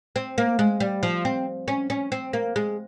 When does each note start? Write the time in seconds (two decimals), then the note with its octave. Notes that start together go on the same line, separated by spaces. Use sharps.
0.16 C4
0.38 A#3
0.59 G#3
0.80 G3
1.03 F3
1.25 C4
1.68 C#4
1.90 C#4
2.12 C4
2.33 A#3
2.56 G#3